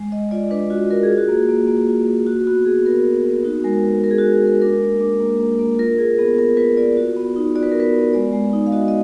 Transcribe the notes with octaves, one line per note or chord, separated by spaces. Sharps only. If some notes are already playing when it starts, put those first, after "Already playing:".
Already playing: G#3
G#3 D#5
F4 D5
D4 B4
F4 F#4
F4 A#4
G#4
F4
F#4
A#3 G#4
A#3
A#3
F4
A#3
F#4
B3 F#4
B3 G#4
B3 A#4
F#4
B3
D#4 F#4
G#3 A#4
G#3 B4
G#3 A#4
G#4
F#4
G#3
G#4
G#3 A#4
D4 A#4
A#3
D4
A#3
A#3
A#3
F4 A#4
F4 G#4
B3 G#4
B3 A#4
F4 B4
F4 D5
F#4
B3
D#4
F#4 D5
B4
B3 A#4
B4
B3
G#3 D5
G#3
D#4
F5
F#4 D#5
D#5